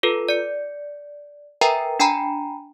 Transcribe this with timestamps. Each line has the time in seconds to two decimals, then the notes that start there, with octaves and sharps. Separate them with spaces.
0.03 F4 A4 B4
0.29 D5 C#7
1.61 A#4 B4 E5 G5 G#5 A#5
1.99 D4 G5 G#5 A#5 B5